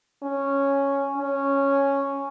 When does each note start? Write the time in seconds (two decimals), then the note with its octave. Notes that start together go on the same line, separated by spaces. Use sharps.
0.23 C#4
1.18 C#4